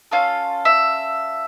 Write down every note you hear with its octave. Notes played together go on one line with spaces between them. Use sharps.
C#4 F4 A4 F5
E5